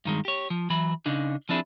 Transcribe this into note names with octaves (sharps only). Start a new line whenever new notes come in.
G2 D#3 G#3
G4 C#5
F3
E3 F#3 B5
C#3 D4 D#4
F3 C4 D4 E4 G#4